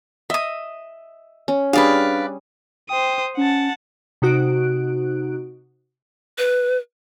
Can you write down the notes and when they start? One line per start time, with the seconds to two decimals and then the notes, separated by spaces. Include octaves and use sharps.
0.30 D#5 E5 D#6
1.48 C#4
1.73 G3 D4 G#4 B4 D5 F5
2.90 C5 G5 D#6
3.37 C#4 F#5 A5
4.22 C3 D#4 F#4 F#6 D7
6.38 B4